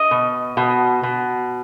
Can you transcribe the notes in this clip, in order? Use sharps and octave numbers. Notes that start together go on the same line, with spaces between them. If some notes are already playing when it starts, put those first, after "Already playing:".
Already playing: D#5
B2
B2
B2